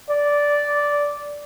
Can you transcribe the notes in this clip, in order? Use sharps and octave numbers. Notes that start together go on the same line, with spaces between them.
D5